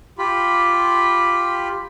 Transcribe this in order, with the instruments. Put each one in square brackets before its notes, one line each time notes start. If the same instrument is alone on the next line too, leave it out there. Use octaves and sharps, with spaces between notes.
[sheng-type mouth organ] F4 G4 B5